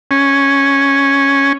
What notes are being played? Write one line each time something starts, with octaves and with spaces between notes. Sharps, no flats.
C#4